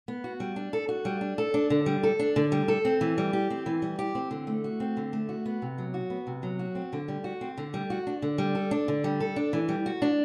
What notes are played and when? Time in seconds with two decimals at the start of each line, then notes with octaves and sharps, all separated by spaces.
0.08 B3
0.24 F#4
0.40 G3
0.56 D4
0.73 A4
0.89 F#4
1.05 G3
1.21 D4
1.38 A4
1.54 D4
1.70 D3
1.86 G3
2.03 A4
2.19 D4
2.36 D3
2.52 G3
2.68 A4
2.85 C4
3.01 E3
3.18 G3
3.33 G4
3.50 C4
3.66 E3
3.82 G3
3.99 G4
4.15 C4
4.31 D3
4.47 A3
4.64 F#4
4.80 C4
4.97 D3
5.13 A3
5.29 F#4
5.46 B3
5.62 C3
5.78 F#3
5.94 F#4
6.10 B3
6.27 C3
6.43 F#3
6.59 F#4
6.75 C4
6.93 D3
7.08 G3
7.24 F#4
7.41 C4
7.58 D3
7.74 G3
7.90 F#4
8.07 D4
8.22 D3
8.38 G3
8.55 A4
8.71 D4
8.88 D3
9.04 G3
9.20 A4
9.36 D4
9.53 E3
9.69 G3
9.86 F#4
10.02 D4